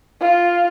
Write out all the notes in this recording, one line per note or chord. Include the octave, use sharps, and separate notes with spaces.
F4